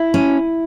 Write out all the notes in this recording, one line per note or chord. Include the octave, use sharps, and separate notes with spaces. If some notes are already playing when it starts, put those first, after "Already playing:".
Already playing: E4
C#4